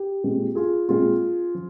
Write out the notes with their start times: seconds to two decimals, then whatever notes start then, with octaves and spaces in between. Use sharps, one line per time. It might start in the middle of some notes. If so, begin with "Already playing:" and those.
Already playing: G4
0.24 A#2 G#3 C4
0.55 F4 G#4
0.89 A#2 G#3 C4 F4 G#4
1.55 F3